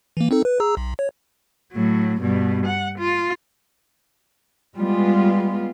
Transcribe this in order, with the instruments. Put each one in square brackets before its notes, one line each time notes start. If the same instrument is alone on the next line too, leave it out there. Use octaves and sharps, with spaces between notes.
[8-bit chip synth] E3 A#3
C4 D#4 A4
B4
G#4 A#5 E6
B1
C#5
[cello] A2 F#3
G2 B2
F#5
F4
[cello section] G3 G#3 B3 F4